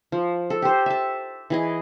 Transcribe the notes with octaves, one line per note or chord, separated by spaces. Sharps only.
F3
A4
G4 C5
E5 A5
E3 G#4 D#5